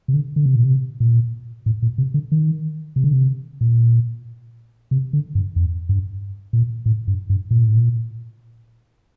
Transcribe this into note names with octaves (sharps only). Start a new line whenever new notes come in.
C3
D3
D3
C3
A#2
C3
A#2
A2
A#2
C3
D3
D#3
C3
D3
C3
A#2
C3
D3
G2
F2
G2
A#2
A2
G2
G2
A#2
A2
A#2